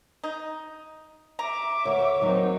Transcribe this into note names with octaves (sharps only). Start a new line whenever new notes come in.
D#4
E5 A#5 D6
D2 C#5
D#2 F#3 C4 D#4